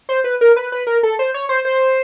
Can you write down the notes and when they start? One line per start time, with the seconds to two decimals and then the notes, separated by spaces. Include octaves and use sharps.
0.09 C5
0.24 B4
0.41 A#4
0.56 B4
0.72 B4
0.87 A#4
1.03 A4
1.19 C5
1.34 C#5
1.49 C5
1.65 C5